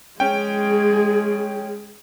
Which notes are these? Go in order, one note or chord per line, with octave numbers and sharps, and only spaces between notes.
G#3 C#4 G#4 G5